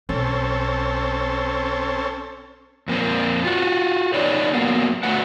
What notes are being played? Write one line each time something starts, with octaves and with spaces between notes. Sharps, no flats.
B1 C4 C#4 A4
F2 A#3 C4
F4 F#4
D#4 G4 B4 C#5 D5
F#3 A#3 B3
F#3 A3 F#4 B4 F#5